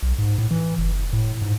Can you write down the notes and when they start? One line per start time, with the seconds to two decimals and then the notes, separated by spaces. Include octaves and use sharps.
0.03 B1
0.19 G#2
0.38 A2
0.51 E3
0.78 F#1
1.13 A2
1.42 G#2